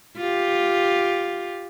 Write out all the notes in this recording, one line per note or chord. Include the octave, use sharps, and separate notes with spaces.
F4 G4